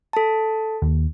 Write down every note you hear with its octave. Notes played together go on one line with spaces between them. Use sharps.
A4 A5
D#2